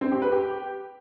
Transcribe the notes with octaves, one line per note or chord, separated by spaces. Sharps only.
C4
G4
B4
G4